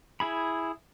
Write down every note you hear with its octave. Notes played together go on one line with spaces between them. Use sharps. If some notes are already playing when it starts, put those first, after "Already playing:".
E4 G#4 B5